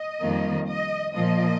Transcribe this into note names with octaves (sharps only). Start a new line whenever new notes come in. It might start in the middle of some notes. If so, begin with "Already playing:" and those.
Already playing: D#5
F2 D#3 G3 A#3
D#5
A#2 F3 A#3 D#5